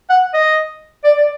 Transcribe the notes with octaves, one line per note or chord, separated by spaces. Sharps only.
F#5
D#5
D5
D5